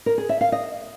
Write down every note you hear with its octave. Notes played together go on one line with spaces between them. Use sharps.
A#4
G#4
E5
F5
D#5